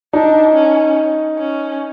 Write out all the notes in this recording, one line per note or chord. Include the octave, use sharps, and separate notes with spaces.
D4 D#4
C#4
C#4